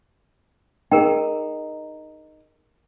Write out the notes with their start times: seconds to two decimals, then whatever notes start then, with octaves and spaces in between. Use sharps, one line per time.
0.91 D#4 G#4 A#4 G5